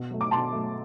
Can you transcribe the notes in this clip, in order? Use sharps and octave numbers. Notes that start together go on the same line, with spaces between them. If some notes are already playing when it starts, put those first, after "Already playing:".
Already playing: B2
F#3 A3
D6
B2 A5 C6
F#3 A3